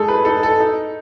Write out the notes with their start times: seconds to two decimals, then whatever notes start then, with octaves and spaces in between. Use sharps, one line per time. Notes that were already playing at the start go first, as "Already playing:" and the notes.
Already playing: G#3 D#4 G#4 A4
0.08 B4
0.25 D#4 A4
0.43 A4
0.60 D#4